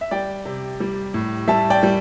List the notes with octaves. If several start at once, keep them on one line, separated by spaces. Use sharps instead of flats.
E5
G3 D5 G5
C3
G3
A2
G3 E5 A5
D5 G5
G3